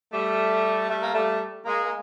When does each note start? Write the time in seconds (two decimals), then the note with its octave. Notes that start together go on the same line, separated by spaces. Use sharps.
0.12 G3 A3
0.88 G3 A3
1.03 A#3
1.13 G3 A3
1.65 G#3 A#3
1.85 A#3